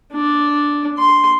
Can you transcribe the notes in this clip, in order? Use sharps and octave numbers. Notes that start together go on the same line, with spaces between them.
D4
C6